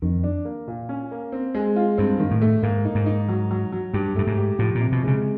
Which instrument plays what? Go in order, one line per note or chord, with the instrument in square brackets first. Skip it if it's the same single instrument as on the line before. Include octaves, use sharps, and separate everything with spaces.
[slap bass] F2 [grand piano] D#3
[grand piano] D4
A#3
A#2
C#4
A#3
C4
G#3
F4
[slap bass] G2 [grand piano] C4
[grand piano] D#3
[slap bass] A2
[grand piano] A3
[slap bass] G#2 [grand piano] A#3
[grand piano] D#4
[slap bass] G#2
[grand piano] D#4
F#3
F#3
F#3
[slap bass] G2 [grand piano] G4
[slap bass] G2 [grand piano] A3
[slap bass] G#2
[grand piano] G4
[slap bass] A2 [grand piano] F3
[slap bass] A#2
[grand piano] C3
[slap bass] B2
[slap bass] C#3 [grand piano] G#3